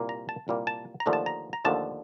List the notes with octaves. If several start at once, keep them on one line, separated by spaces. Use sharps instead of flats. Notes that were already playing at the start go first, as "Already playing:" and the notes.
Already playing: C2 A#2 G3 A#3
A#5
A5
C2 A#2 G3 A#3
A5
A#5
D#2 D3 F3 A3 D4
A5
A#5
A#5
D#2 D3 F3 A3 D4 A5